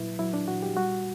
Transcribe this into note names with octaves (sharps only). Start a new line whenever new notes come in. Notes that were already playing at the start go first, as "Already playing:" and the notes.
Already playing: A#2 F#3 E4 B4
F#3 E4
D4
A#2 F#4
G4
G3 F#4